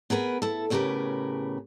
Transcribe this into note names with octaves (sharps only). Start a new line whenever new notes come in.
B3 G#4 A#4 B4
E4 A4
E2 A2 C#3 G4 A#4 B4